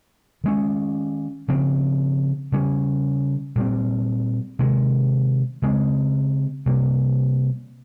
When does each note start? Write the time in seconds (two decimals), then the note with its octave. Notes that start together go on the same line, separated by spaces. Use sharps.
0.44 D#3 G#3 C#4
1.48 C#3 F3 C4
2.52 C#3 G3 C#4
3.56 A#2 G3 C4
4.59 C3 D#3 G#3
5.62 C#3 G#3 C4
6.66 C3 G3 A#3